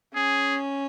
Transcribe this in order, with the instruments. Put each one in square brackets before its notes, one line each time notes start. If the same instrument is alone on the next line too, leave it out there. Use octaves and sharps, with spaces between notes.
[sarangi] C#4 [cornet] G#4